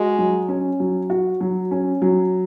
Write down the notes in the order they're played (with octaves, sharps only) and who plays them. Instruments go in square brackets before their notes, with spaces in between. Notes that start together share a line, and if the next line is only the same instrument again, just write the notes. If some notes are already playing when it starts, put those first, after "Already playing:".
Already playing: [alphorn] G#3 [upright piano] F#4
[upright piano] F#3
C#4
F#3
F#4
F#3
C#4
F#3